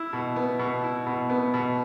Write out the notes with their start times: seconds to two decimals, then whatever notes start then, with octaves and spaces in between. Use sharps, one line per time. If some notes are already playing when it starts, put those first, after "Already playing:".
Already playing: E4
0.13 B2
0.36 B3
0.59 B2
0.83 E4
1.06 B2
1.30 B3
1.54 B2